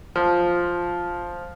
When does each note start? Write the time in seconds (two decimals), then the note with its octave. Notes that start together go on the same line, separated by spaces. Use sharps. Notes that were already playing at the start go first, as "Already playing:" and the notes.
0.16 F3